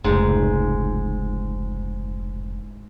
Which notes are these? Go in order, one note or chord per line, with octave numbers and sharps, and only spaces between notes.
F1 C#2 G#2